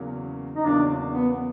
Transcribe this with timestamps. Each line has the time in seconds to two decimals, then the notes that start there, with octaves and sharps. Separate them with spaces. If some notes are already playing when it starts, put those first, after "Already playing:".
Already playing: E2 C#3 F#3 A#3
0.56 D#4
0.65 E2 C#3 F#3 A#3 D4
1.13 B3